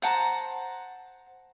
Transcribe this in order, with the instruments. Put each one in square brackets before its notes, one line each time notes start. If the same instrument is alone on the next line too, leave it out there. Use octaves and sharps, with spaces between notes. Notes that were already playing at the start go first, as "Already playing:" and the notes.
[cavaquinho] C5 F#5 A5 A#5